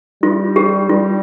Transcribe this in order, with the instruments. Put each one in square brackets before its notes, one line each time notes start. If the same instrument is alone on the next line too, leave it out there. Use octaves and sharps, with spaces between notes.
[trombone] G3 [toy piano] F4
[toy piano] G4
[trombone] G3 [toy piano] F4